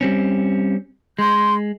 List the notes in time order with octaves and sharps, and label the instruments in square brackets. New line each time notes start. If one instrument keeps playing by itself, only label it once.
[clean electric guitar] G3 C4 C#4
[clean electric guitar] G#3 [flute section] C6 G6